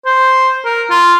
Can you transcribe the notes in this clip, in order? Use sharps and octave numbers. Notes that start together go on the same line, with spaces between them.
C5
A#4
F4